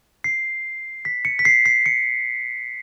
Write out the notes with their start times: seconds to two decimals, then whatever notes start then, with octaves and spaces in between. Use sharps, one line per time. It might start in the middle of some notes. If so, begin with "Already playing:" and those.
0.24 C7
1.05 B6
1.25 C#7
1.39 B6
1.45 C7
1.65 C7
1.86 C#7